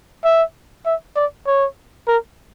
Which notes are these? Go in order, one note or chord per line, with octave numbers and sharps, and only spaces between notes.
E5
E5
D5
C#5
A#4